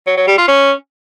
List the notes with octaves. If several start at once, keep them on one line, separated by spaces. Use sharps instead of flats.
F#3
F#3
G3
F4
C#4